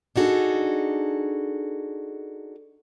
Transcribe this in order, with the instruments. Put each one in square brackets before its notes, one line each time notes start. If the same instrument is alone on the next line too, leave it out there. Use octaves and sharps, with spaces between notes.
[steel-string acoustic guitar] D4 D#4 F#4 G#4 A4